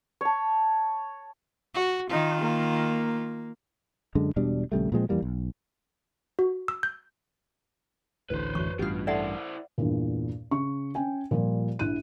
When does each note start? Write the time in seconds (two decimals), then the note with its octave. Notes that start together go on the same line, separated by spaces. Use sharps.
0.21 C#5 A5
1.75 F#4
2.10 D#3 D#4 F4
2.41 A#3
4.15 F#2 D3 G#3
4.36 E1 B2 G3 D4
4.72 A#1 C#3 G3 A3
4.92 A#2 F3 G#3 C4
5.09 F2 E3 G3 A#3
5.22 B1
6.39 F#4
6.68 E6
6.83 G6
8.30 A1 D2 A2 B4 C5
8.55 F#2 E3 C#6
8.79 A1 G2 B2 F4 G4
9.07 E4 A4 C5 D5 E5 F#5 A5
9.78 E2 G2 A#2
10.51 C#3 C#6
10.95 C#4 G5 G#5
11.31 A#2 F3 G3
11.79 A#1 E4 F#6 D#7